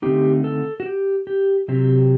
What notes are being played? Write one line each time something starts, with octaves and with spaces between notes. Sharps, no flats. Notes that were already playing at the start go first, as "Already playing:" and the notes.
D3 A3 C4 D#4 G4
A4
F#4
G4
G4
C3 F#3 C4 G4